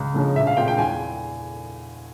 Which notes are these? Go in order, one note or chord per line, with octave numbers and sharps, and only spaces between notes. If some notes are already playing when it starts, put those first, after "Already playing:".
Already playing: C#2
C#3 F3 G#3 C#4
A#1 E5
F5
A#2 G#3 C4 F4 G5
G5
E2 G#5